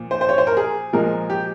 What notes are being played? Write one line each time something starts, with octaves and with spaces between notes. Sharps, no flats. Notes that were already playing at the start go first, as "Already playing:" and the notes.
Already playing: A#2 F3
C5
C5
C#5
C5
A#4
G#4
A#2 F3 G#3 A#4
G4